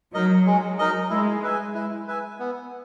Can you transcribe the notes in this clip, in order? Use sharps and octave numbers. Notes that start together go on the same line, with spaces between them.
F#3 D#4 A#4 D#5
G#3
D#4 A#4 D#5
G#3 E4
B4 E5 G#5
E4
B4 E5 G#5
B3